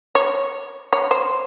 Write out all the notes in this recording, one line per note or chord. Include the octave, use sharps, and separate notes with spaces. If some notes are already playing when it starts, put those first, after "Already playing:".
C#5
C#5
C5